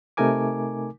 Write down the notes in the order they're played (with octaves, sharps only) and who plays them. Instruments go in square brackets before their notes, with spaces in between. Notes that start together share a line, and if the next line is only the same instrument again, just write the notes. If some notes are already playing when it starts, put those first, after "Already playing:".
[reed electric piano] C3 A3 D#4 A#4 G#5 D6